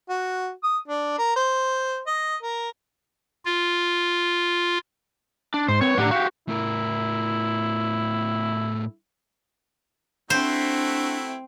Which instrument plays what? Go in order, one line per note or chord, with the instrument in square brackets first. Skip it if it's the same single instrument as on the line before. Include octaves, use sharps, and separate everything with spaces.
[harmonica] F#4
D#6
D4
A#4
C5
D#5
A#4
[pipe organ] F4
[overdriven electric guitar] D4
[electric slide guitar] G#2 [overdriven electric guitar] C5
[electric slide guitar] C4 B4 [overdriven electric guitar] C#5
[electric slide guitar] A2 G4 A#5 [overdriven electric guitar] D4 F#5
[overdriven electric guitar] F#4 G4 [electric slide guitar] F5
[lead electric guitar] A2 A#4 [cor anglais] E4
[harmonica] A3 E4 F#4 [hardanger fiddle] C4 [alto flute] D4 [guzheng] C5